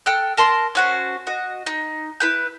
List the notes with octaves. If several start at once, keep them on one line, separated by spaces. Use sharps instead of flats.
A4 G5 F6 F#6
A#4 A5 C6
C#4 F#4 C5
F#4 D#5
D#4
E4 B4 G6